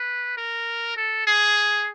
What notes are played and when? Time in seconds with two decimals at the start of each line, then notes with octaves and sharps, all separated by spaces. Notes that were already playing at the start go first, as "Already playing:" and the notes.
Already playing: B4
0.37 A#4
0.97 A4
1.27 G#4